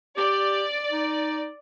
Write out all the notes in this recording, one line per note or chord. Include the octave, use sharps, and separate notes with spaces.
G4 D5
D#4